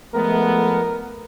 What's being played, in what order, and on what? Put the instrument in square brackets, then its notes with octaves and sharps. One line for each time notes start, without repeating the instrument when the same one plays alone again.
[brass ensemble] F3 A3 [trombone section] G#3 B3 [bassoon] A#4